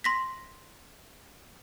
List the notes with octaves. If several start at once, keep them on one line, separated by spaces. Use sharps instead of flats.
C6 A#6 B6